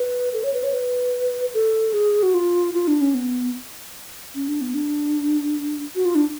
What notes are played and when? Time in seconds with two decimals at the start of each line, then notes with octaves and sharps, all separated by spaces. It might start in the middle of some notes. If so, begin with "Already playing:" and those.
Already playing: B4
0.33 A4
0.43 C#5
0.54 B4
0.63 C#5
0.73 B4
1.54 A4
1.93 G#4
2.23 F#4
2.34 F4
2.74 F4
2.87 D4
3.01 C#4
3.14 B3
4.35 C#4
4.48 D4
4.61 B3
4.74 D4
5.95 F#4
6.05 F4
6.15 D4